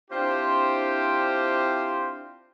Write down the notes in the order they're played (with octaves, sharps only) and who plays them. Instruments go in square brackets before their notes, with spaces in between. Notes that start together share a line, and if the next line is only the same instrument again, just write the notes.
[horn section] C4 D4 E4 F4 G4 C5